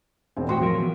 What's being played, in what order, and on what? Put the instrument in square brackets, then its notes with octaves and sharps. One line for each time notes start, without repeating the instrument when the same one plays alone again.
[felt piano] E1 C4
[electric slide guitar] A2 F#4 G5 [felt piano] C6
[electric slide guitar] F3 F#3 A#4
E3 B3